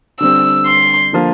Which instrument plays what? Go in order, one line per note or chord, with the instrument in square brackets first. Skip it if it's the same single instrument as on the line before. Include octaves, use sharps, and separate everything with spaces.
[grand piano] D3 G3 C4 [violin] E6
[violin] C6
[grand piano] D3 F3 A#3 F4